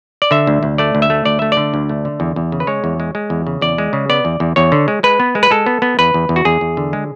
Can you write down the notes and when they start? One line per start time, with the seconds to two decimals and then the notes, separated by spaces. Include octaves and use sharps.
0.22 D5
0.31 D3 E5
0.47 D2
0.63 D2
0.78 A3 D5
0.95 D2
1.02 E5
1.10 A3
1.25 D2 D5
1.39 A3 E5
1.52 D5
1.57 D3
1.74 D2
1.89 A3
2.05 D3
2.20 E2
2.36 E2
2.52 C#3
2.60 B4
2.67 G#3 C#5
2.84 E2
3.00 G#3
3.15 G#3
3.30 E2
3.47 C#3
3.61 E2 D5
3.78 G#3
3.93 C#3
4.10 B3 D5
4.25 E2
4.40 E2
4.56 E2 C#5
4.72 D3
4.88 G#3
5.03 G#3 B4
5.20 B3
5.35 G#3
5.43 B4
5.50 G#3 A4
5.66 B3
5.82 B3
5.99 E2 B4
6.14 E2
6.29 E2
6.36 F#4
6.45 E2 G#4
6.61 E2
6.77 D3
6.93 G#3